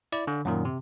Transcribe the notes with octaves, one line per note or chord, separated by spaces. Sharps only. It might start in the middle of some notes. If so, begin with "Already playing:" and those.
E4 D5
D3
F#2 A#2 D#3
C3